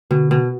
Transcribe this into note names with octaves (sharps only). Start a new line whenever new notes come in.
B2 D3
B2